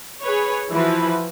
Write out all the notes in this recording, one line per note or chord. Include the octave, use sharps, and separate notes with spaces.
G#4 B4 C#5
E3 F3 E4 F#4 B4